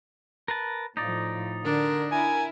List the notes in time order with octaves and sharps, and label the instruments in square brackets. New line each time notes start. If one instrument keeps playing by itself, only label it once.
[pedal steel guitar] A#4 B4 A5
[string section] A2 F3 [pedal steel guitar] D#4 D5
[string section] D3 [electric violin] D4 [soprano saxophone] A#4
[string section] E4 A#4 [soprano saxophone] G#5